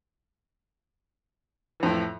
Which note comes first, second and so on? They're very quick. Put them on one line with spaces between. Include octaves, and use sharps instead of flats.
E3 F2 A2